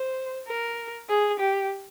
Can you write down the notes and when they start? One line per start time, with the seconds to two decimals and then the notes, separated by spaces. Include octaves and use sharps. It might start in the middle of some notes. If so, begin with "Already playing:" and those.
Already playing: C5
0.48 A#4
1.09 G#4
1.40 G4